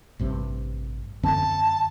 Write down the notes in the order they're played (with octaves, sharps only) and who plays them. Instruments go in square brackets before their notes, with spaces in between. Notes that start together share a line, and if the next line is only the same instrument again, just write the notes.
[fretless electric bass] A1 G2 C3
[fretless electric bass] F#2 D3 C4 [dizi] A5